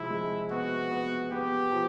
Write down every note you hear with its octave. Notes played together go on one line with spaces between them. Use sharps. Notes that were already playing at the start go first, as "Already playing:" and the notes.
Already playing: C3 F3 G#3 E4
G#3
B3 F#4
B3
B3 G4
F3